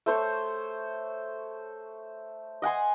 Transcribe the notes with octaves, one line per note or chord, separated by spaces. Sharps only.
A3 C5 C#5
D#5 F#5 G#5 C6